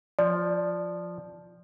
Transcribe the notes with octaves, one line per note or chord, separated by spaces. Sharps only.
F3 D5